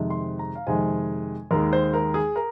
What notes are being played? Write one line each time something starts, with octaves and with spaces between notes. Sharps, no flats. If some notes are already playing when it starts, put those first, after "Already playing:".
Already playing: F2 C3 D#3 G#3
C6
A#5
F5
F2 C3 D#3 G#3 G#5
D#2 D#3 G#3 A#4
C5
A#4
G#4
A#4